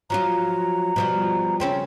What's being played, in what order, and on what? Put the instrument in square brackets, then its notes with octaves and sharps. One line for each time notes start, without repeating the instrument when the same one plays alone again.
[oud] F3 F#3 F4 [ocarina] A#5
[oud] B2 F3 G3
[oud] C#3 C4 C#4 [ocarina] G5